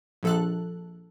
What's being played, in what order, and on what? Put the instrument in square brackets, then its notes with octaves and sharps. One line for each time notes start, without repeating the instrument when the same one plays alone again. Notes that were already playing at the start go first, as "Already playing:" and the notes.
[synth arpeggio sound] A#1 A4 F#6